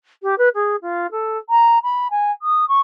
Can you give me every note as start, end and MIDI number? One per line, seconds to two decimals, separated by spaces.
0.22 0.35 67
0.38 0.49 71
0.54 0.76 68
0.82 1.07 65
1.11 1.38 69
1.49 1.79 82
1.83 2.08 83
2.11 2.31 80
2.42 2.68 87
2.68 2.80 85